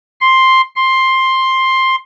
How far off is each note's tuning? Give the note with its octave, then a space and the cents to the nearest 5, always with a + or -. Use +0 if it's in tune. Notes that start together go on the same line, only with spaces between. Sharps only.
C6 +5
C6 +10